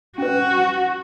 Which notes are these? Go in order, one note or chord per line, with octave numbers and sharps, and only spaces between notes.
C#4 F#4 B4